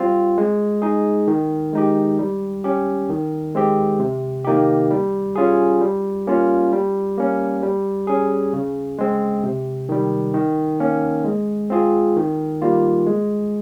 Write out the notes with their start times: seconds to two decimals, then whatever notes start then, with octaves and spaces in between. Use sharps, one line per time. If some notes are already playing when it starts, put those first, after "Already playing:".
Already playing: G3 C4 F4
0.38 G#3
0.82 D#4 G#4
1.27 D#3
1.73 G#3 D#4 G4
2.19 G3
2.64 C#4 G4
3.09 D#3
3.55 G#3 C4 G4
3.99 C3
4.45 D#3 A#3 D#4 G4
4.91 G3
5.36 C#4 F4 G#4
5.81 G3
6.27 A#3 C#4 F4
6.72 G3
7.18 A#3 C#4
7.62 G3
8.07 C#4 G#4
8.53 C#3
8.98 G#3 C4
9.43 C3
9.89 D#3 G3
10.34 D#3
10.80 A#3 C#4
11.25 G#3
11.70 C4 F4 G#4
12.16 D#3
12.62 G3 A#3 F4
13.06 G#3